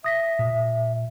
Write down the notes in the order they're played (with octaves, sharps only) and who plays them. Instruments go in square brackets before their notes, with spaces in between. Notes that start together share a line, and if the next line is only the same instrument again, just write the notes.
[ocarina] E5 [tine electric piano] D#6 A#6 B6
[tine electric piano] A#2